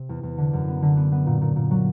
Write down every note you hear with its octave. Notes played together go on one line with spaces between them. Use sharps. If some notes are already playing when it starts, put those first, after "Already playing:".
Already playing: C3
E2
E2
D3
F#2
B3
D3
B3
B3
A#2
A#2
A#2
F#3